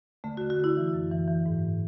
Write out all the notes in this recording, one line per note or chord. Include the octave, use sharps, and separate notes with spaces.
D3 A3
F#4
D3
F#4
D3 E4
E3
F#2
E3
E3
G#2